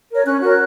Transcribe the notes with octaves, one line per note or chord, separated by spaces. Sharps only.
A#4 C#5
C#4 F#6
F#4 A#4 C#5